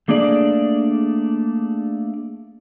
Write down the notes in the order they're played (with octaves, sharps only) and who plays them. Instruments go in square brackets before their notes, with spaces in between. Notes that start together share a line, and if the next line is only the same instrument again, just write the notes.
[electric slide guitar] A3 A#3 D4 G#4 D5